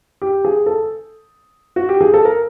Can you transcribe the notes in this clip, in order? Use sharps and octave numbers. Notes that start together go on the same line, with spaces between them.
G4
G#4
A4
F#4
G4
G#4
A4
A#4